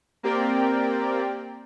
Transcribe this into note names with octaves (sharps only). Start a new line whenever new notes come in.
A#3 C4 G4 A#4 D5 G5